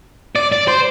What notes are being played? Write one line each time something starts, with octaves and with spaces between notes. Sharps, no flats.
D5
D5
C5